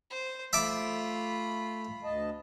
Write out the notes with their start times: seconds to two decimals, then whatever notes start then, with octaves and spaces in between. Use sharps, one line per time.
0.10 C5
0.53 A3 F4 E5 A5 B5 D6
2.04 D2 D#5 A5